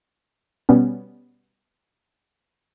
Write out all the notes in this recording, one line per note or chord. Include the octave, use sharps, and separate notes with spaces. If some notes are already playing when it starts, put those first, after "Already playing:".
B2 G3 B3 C#4